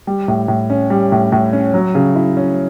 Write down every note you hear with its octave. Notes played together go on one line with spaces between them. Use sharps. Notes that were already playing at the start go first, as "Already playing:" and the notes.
G3
A2
A2
C#4
G3
A2
A2
C#4
F#3
C#3
E4
C#4